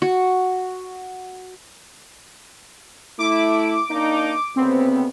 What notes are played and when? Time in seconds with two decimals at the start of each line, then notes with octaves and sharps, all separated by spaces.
0.02 F#4
3.18 A3 E4 D6
3.90 A#3 D4 D#4
4.56 D2 C#3 B3 C4